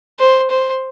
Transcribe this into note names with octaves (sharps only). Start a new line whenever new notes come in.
C5
C5